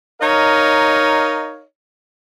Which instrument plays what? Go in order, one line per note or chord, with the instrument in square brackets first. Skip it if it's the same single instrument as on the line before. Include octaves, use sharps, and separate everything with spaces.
[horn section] D#4 A#4 C#5 D#5 F5